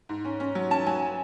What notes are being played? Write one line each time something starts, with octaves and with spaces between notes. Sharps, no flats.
G#2
C#4
C#4
F#3
C#4 A5
F#3 G#5